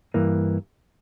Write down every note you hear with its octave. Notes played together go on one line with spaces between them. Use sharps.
G2 E3 A#3